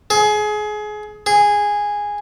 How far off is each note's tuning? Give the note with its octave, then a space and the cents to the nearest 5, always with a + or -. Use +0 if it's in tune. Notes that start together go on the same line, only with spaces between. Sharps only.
G#4 +25
G#4 -10